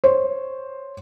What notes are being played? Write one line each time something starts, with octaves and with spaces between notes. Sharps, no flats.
C5 C#5